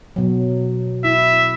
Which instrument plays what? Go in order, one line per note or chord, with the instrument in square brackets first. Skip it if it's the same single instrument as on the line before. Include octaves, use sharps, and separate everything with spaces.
[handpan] B2 F#3
[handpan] E4 [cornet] E5